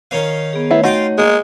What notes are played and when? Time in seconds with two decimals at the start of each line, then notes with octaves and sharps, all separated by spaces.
0.11 D#3 C#4 F5
0.53 B3 G#4
0.71 A3 B3 E4 C#5
0.84 D#4 F4 F#4 F5 G5
1.18 G#3 A#3